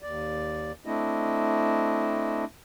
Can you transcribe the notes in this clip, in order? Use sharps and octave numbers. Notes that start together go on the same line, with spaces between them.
D#2 D5
A3 C4 D4 E4 D#5